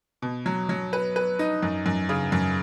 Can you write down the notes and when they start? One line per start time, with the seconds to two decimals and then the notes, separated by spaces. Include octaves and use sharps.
0.22 B2
0.46 F#3
0.69 F#3
0.93 B4
1.16 B4
1.39 D#4
1.63 F#2
1.86 F#2
2.09 C#3
2.32 F#2